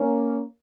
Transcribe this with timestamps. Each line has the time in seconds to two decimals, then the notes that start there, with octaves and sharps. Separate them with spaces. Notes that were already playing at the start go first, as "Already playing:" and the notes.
Already playing: A#3 C#4